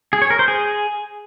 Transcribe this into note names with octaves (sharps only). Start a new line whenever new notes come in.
G#4
C#5
A#4
C5
G#4